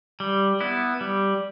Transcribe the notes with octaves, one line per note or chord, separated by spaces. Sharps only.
G3
B3 E4
G3